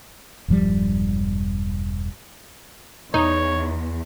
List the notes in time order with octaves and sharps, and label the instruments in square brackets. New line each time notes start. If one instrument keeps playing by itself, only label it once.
[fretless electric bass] E1 G2 F3 G3
[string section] E2 [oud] D#4 [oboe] C#5